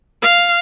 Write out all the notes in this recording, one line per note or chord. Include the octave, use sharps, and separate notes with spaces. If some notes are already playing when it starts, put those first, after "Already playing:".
F5